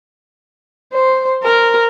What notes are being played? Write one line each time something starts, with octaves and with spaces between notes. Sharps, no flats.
C5
A#4